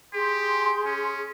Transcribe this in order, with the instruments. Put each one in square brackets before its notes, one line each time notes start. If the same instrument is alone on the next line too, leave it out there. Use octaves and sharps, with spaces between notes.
[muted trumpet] G4 [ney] G#4 [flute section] C6
[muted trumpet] C#4